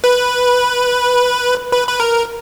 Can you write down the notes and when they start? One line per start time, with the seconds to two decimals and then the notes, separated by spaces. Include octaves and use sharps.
0.04 B4
1.72 B4
1.88 B4
2.00 A#4